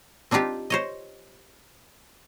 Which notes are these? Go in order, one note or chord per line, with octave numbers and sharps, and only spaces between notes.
C4 D4 D#4 F4 G4
C5 C#5 D#5